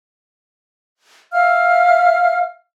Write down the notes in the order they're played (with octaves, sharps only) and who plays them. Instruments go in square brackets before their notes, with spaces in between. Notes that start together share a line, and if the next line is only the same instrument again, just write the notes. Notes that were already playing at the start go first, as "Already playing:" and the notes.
[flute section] E5 F5 F6